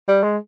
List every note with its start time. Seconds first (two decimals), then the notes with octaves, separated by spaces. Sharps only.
0.08 G3
0.23 G#3